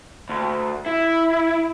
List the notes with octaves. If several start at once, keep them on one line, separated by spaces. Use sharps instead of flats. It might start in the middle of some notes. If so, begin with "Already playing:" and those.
D2
E4